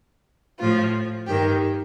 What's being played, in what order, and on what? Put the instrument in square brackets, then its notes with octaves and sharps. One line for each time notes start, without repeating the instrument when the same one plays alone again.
[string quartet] A2 F3 F4
G2 D#3 G4